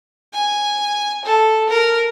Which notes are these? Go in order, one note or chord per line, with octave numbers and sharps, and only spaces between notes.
G#5
A4
A#4